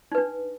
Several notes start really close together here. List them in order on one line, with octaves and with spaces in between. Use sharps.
D#4 B4 D4